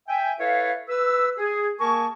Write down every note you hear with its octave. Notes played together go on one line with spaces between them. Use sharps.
E5 G5 G#5
E4 A4 B4 C#5 E5 F5
B4 E6
G#4
A#3 G#4 A#4 G#5 A5 C#6